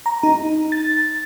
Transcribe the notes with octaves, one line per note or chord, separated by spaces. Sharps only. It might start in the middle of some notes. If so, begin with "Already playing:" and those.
A#5
D#4
A6